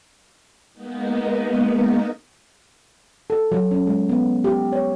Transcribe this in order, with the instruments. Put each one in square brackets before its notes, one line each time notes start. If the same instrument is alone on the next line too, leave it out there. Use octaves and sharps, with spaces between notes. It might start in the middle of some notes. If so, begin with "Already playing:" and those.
[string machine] G#3 A#3 B3 D#4
[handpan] A4
F#3
C#4
G#3
B3
G4
C#5